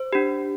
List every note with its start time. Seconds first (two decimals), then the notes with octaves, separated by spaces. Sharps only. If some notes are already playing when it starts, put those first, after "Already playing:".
Already playing: C5
0.13 D4 G4